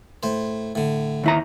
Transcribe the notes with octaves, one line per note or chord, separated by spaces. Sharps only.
A2 C5
A2 D3
D#2 E4 A#5